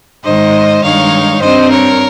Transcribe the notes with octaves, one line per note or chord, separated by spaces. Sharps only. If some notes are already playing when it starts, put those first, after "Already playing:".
G#2 D#3 G#3 C5 D#5
G2 D#3 G#3 D#4 C#5 F5
G2 G3 C4 C5 D#5
A#4 C#5